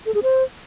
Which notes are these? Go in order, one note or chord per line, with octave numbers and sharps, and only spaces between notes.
A4
G#4
C5